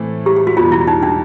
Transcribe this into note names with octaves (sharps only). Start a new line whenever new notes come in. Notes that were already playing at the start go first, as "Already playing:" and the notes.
Already playing: A2 E3 A3 C4
G4
G4
F#4
E2 B2 G3 F4
E4
D#4
D4